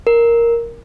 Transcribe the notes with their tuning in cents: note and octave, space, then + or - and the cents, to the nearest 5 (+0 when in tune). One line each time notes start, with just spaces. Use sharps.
A#4 +0